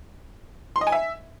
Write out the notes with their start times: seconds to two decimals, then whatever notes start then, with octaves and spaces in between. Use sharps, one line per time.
0.76 C6
0.81 D#5
0.87 G#5
0.92 E5